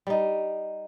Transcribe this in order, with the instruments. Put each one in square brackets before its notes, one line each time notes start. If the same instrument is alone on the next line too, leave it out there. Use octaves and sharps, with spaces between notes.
[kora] G3 D#4